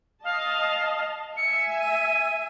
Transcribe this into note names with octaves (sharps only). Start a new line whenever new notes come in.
D#5 F5 A5
E5 G#5 C#7
D#7